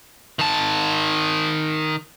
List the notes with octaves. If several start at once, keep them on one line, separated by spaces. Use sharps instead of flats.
D#3 A5